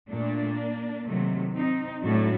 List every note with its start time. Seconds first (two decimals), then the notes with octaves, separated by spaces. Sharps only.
0.11 A#2 A3 A#3 D4
1.07 C3 D#3 F#3 A3
1.55 C4 D#4
2.03 A2 F#3 A3 D4 F#4